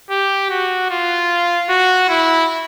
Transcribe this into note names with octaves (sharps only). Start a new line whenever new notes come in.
G4
F#4
F4
F#4
E4